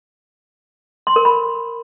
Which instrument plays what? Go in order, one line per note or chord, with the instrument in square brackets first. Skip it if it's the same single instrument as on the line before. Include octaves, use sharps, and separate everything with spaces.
[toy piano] C6
A#4
B5